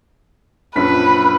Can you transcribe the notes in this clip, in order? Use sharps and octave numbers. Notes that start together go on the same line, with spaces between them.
A#1 F#2 B4 B6